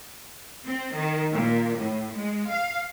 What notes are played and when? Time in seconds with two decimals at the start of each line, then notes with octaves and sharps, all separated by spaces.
0.66 C4
0.95 D#3
1.32 A#2
1.79 A2
2.17 G#3
2.51 F5